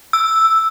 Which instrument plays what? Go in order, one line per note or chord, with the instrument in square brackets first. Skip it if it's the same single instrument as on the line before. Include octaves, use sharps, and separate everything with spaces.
[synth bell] E6